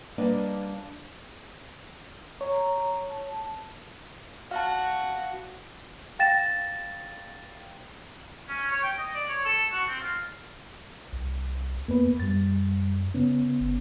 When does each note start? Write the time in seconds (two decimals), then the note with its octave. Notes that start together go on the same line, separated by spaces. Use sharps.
0.18 G3 A#3 D4 B4 D5 D#5
2.41 C#5 A#5
3.09 A5
4.51 F#4 F5 A5
6.19 F5 G5 A6 A#6 E7
8.49 C#4
8.71 C#5
8.83 G5
8.98 D#5
9.14 D5
9.29 C#5
9.46 A4
9.72 F#4
9.88 C4
10.01 F4
11.13 C2
11.88 F2 A#3 B3 B4
12.20 F#2 G3 A6
13.14 C#3 B3 C#4
13.61 F#1